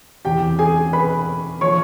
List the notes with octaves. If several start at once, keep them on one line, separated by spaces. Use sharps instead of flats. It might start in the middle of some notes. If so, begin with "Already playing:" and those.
E2 C3 E3 G4 G5
G#4 G#5
B4 B5
F3 C#5 C#6